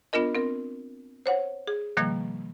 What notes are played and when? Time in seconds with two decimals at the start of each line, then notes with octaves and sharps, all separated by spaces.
0.13 B3 D4 F4 A#4 D#5
0.35 C4 A#4
1.26 C5 C#5 F#5
1.67 G#4
1.97 B2 D#3 F3 G3 A#3